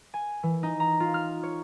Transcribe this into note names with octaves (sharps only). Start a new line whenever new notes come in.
G#5
E3
D#4
A#5
F4
F6
C#5